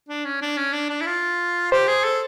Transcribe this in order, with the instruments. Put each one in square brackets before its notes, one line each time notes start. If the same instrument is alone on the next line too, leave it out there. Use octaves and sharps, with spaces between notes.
[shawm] D4
C#4
D4
C#4
D4
D4
E4
F4
[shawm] G4 [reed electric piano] C5
[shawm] G#4
A4